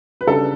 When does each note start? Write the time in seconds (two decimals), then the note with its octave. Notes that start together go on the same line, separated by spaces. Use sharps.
0.21 B4
0.27 C#3 G3 D4 A4